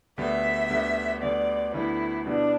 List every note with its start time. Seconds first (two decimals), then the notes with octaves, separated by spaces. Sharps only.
0.17 D2 D3 G3 B3 E5
0.70 D2 D3 G3 B3
1.22 D2 D3 G3 B3 D5
1.74 D2 D3 G3 B3 E4
2.26 B2 G3 B3 D4 E4